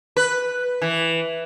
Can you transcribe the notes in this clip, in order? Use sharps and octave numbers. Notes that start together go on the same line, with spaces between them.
B4
E3